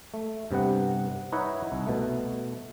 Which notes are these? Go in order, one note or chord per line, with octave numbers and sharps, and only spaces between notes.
A3
G2 C3 B3 F#5
D#4 E4 B4 C#5 D#5 F#5
C2
B2 A3